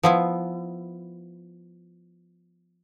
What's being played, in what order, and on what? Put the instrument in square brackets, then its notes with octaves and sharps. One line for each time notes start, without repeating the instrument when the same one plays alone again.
[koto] F3 B3 E4